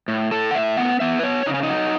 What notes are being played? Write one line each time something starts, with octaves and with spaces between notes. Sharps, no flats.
A2
A2 A4
F#5
A2 E5
B3 F#5
B3 E5
B4
B3 C#5
C#3 D#4
C#4
D#4
F#3